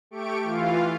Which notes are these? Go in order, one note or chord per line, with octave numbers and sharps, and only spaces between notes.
A3 G4 C#6 D7
E3 F4 F5